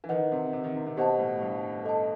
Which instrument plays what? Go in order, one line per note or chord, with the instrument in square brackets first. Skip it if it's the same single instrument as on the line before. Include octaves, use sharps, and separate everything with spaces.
[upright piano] E3
[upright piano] D#3 [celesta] B4 D#5 F#5
[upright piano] C3
C3
D#3
C3
C3
[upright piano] B2 [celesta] G4 C5 D#5 F#5 A5
[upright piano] A2
G2
[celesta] A4 D#5 A5